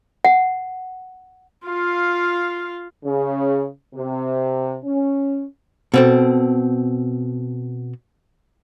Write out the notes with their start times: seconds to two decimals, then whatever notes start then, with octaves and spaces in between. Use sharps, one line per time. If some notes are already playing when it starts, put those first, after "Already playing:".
0.25 F#5
1.67 F4 F5
3.05 C#3
3.95 C3
4.85 C#4
5.94 B2 C4 A4